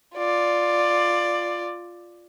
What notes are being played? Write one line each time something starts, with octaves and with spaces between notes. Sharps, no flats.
F4 D5